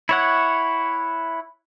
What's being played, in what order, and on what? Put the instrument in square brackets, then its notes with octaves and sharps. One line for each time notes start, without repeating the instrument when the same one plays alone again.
[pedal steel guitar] E4 C#5 F#5